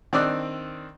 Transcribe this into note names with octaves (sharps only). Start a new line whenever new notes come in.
D#3 C4 D4 D5 E6 F#6